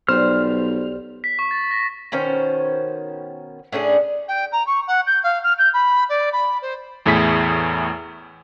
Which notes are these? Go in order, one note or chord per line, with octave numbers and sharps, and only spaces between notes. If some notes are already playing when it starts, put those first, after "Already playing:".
B1 G3 C5 F6
B6
C#6
A6
A#6
B2 D#3 C#4 C5
A2 C#4 D4 G#4
G5
A#5
C#6
F#5
G6
F5
F6
G6
B5
D5
B5
C5
E2 A2 E4 G#4 B6